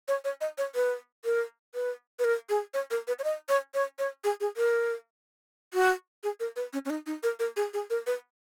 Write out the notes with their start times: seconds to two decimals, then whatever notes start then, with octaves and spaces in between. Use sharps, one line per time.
0.08 C#5
0.24 C#5
0.41 D#5
0.58 C#5
0.75 B4
1.25 A#4
1.75 B4
2.19 B4
2.24 A#4
2.49 G#4
2.74 C#5
2.91 A#4
3.08 B4
3.19 C#5
3.24 D#5
3.49 C#5
3.74 C#5
3.99 C#5
4.24 G#4
4.41 G#4
4.57 A#4
5.74 F#4
6.24 G#4
6.40 A#4
6.56 B4
6.73 C#4
6.85 C#4
6.90 D#4
7.06 D#4
7.23 A#4
7.39 A#4
7.57 G#4
7.74 G#4
7.90 A#4
8.07 B4